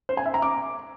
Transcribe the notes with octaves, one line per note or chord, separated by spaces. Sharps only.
C5
G#5
E5
A#5
D6